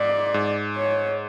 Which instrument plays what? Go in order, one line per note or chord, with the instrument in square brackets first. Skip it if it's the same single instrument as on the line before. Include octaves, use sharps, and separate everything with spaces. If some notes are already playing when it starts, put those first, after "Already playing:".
Already playing: [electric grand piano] G#2 [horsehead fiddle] D5
[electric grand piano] G#2
[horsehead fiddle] C#5